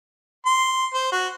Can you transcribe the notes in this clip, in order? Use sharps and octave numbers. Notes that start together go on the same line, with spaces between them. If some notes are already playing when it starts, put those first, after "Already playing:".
C6
C5
F#4